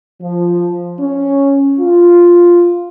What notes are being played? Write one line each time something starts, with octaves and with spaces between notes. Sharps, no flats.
F3
C#4
F4